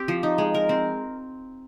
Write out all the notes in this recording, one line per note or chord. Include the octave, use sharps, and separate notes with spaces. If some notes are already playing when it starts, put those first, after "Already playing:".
Already playing: C4 G4
F3
D#4
G#3
A#4
C4